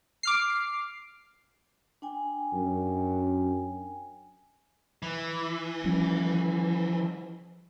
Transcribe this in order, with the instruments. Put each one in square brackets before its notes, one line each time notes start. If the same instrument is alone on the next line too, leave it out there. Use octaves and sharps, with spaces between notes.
[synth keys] D6 F6 C7
[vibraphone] D4 G5 G#5
[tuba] F#2
[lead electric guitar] E3
[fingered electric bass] F3 G3 C#4